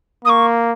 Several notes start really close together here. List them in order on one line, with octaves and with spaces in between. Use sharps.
A#3 D#6 C#6